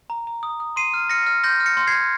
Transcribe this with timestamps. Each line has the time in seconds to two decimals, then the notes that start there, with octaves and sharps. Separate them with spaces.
0.10 A#5
0.27 A#5
0.43 D#6
0.60 D#6
0.76 C6 C7 D#7
0.94 F6
1.10 F6 A#6 C#7
1.26 F6
1.44 C6 G6 A#6
1.60 F6
1.66 A#6 C#7
1.77 C6
1.87 G#6 C7
1.94 F6